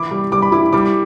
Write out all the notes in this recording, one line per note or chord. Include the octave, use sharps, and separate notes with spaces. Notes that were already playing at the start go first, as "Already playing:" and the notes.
Already playing: E3 E4 D6
G3
G3 D6
B5
E4 D6
G3 D6